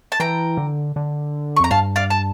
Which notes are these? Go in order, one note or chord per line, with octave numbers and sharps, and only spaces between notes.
A5
E3 G5 A#5
D3
D3
C#6
F2 A#5
G2 F5 A5
D5 F5
A5